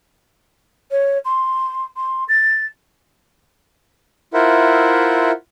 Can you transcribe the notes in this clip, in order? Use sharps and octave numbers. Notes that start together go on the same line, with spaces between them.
C#5
C6
C6
A6
E4 F4 A#4 C5 E5 F#5